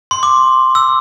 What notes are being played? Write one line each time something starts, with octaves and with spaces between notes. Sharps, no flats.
C6
D6
E6